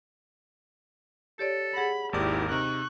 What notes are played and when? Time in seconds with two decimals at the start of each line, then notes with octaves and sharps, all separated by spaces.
1.39 G4 A4 C#5 D5
1.75 G#4 F#5 B5 A#6
2.13 G#1 D#2 E4 G4 A#4 D5
2.52 C3 D#4 C#6 F#6